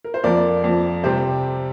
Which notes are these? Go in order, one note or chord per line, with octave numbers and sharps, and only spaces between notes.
A#4
C5
F2 F3 A#4 D5
F2 F3
C3 G3 G4 C5